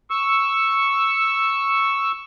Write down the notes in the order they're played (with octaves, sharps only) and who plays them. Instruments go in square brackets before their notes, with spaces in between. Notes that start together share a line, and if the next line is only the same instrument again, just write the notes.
[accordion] C#6 E6